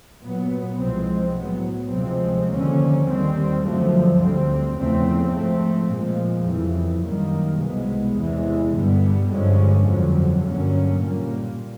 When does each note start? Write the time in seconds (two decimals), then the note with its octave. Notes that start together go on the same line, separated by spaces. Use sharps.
0.21 A#2 F#3 B3
0.78 C2 C3 F3 G#3 C4
1.34 A2 F#3 B3
1.91 D2 C3 F3 G#3 C4
2.48 D#2 D3 F3 A#3 C#4
3.05 D#2 D#3 G3 C4
3.62 F#2 D3 F3 A3
4.18 D2 D3 G3 C4
4.75 E2 C#3 F3 A3 C4
5.32 G#2 F3 A3 C4
5.89 A#2 F3 G#3
6.46 F2 C#3 E3 G3
7.03 F#2 D#3 G3 A#3
7.60 C2 B2 G#3 B3
8.16 E2 C3 E3 G#3
8.73 G2 D3 G3 B3
9.30 G2 D3 F3 G#3 C#4
9.87 F2 D3 F#3
10.44 G2 D3 F#3 A#3 C#4
11.01 A#2 G3 A#3